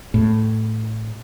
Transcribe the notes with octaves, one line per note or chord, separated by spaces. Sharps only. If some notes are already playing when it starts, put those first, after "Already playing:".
A2